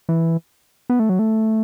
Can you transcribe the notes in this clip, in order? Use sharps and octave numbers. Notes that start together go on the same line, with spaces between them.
E3
B3
A3
F#3
A3